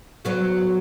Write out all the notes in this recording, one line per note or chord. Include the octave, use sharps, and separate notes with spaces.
F#3 B3 F#4